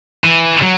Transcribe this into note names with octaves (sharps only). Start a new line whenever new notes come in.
E3
F#3